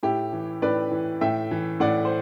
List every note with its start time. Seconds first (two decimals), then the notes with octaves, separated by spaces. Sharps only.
0.03 A2 E4 G4
0.33 E3
0.62 A2 B4 D5
0.91 E3
1.21 A2 E5 G5
1.51 E3
1.80 A2 D5 F#5
2.05 C5